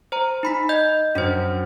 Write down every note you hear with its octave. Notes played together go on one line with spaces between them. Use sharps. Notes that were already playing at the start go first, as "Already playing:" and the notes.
C5 A#5
D#4 B5 B6
D#5 G6
F#2 D4 C5